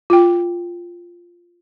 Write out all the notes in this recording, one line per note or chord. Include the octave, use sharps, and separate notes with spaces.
F4 G5